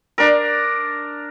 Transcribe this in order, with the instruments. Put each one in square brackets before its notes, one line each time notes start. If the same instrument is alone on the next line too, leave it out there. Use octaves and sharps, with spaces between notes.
[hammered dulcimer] D4 A#4